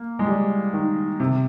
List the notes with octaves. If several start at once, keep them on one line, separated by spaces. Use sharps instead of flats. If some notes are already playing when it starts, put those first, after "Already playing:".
Already playing: A#3
G#3
G3
D#3
C3